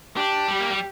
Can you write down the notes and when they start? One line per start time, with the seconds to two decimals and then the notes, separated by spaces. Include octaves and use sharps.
0.16 D4 G4
0.48 G3
0.60 A#3
0.70 G3